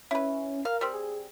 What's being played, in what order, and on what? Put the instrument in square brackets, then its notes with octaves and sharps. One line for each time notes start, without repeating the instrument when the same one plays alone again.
[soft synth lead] C#4 [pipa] E4 B4
[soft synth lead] A#4 [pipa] F5
[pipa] G3 C4
[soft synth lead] G#4